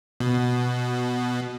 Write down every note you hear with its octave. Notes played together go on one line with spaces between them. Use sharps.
B2